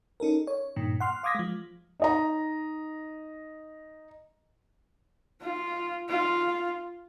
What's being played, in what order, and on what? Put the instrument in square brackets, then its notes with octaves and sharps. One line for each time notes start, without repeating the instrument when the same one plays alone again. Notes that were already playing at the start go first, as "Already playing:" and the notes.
[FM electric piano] C#4 D#4 A4 A#4
C#5
G2 A#2 D#3
F#5 C6 F6
F5 D6 D#6 G#6 A#6 B6
F3 G#3
[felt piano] D#4 D#5 A#5
[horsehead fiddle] F4
F4